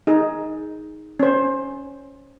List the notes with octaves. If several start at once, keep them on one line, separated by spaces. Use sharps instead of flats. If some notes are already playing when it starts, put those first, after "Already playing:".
D#4 G#4
C#4 C5